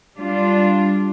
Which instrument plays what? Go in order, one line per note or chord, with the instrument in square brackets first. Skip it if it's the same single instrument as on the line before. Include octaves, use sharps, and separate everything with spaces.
[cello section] G3 D4 F4